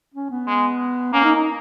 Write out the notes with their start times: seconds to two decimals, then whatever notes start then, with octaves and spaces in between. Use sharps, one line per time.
0.14 C#4
0.31 B3
0.47 G#3
1.13 A#3 C#4
1.24 D#4
1.35 D#4